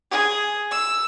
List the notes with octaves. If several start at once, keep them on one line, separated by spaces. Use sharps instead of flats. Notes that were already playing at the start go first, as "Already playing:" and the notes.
G#4
E6